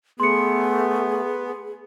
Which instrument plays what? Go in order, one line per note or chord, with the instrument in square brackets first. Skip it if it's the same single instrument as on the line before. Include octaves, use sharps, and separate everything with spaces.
[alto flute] A3 [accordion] B3 [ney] G#4 [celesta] C6 C#7